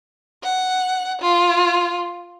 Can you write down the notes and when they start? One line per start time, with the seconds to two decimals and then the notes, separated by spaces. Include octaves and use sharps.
0.43 F#5
1.22 F4